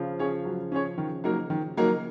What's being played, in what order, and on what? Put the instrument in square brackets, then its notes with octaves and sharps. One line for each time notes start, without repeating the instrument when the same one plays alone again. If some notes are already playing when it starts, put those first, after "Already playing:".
Already playing: [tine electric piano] C#3 F3
[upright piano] C#4 G#4 C#5
F#3
C#4 G#4 C#5
D#3
F#3 A#3 D#4 A#4
D#3
F#3 A#3 D#4 A#4